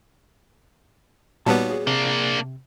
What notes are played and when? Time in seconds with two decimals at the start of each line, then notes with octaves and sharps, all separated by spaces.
1.46 A#2 G3 B3 D#4 F#4 C#5 F5 A5
1.70 G#4
1.87 C3 A#3 D4